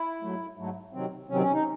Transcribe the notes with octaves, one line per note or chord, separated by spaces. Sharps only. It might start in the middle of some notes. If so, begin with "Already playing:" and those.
Already playing: E4
G#2 F#3 A3
G#2 F#3 A3
C3 D#3 F#3 C4
C3 D#3 F#3 C4 C#4
C#4
D#4